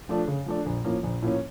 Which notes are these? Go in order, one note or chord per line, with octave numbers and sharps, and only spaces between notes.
F3 A3 D4
C#3
F3 A3 D4
A#1
A2 F3 A#3 C#4
A#1
A2 F3 A#3 C#4